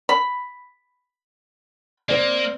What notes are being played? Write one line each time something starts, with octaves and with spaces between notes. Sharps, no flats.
B5
A#3 C4 D5